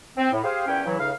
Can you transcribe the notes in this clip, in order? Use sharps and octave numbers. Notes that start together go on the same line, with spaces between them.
C4
A2
G4 G#4 C5 F5
E2 A#2 C#4 E4 G5
C#3 E3 F#3 E4
C#2 A2 C#3 D#4 F5